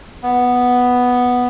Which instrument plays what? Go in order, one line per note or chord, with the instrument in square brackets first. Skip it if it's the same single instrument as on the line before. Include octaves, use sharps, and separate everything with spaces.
[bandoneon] B3